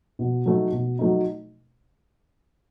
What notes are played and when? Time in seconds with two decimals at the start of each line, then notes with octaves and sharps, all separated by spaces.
0.19 B2
0.46 F#3 A3 D#4
0.72 B2
0.99 F#3 A3 D#4